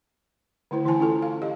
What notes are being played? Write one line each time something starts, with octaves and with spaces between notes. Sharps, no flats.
D3 A3 E4 C5
E3 E4 C5 G#5 A5 C6
C#4 E4 F4 A4 G5
F5
G4 D#5 F5